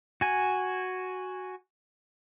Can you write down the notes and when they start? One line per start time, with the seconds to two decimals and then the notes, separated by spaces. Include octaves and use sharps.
0.21 F#4 G#5